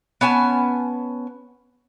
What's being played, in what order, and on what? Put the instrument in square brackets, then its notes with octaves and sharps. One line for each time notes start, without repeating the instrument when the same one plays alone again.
[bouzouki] B3 C#4 G#5 A5